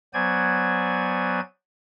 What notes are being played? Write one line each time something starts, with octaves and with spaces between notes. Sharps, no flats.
F#3 B3 C5 D5 G#5 G#6